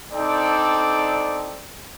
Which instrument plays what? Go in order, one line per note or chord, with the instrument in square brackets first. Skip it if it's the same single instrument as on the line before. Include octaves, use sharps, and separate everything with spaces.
[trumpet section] C4 D4 D#4 A4 D5 G5